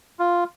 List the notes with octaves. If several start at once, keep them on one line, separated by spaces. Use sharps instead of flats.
F4